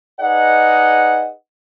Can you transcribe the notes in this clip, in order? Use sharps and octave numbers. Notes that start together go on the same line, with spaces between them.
D#4 G#4 B4 D5 D#5 F#5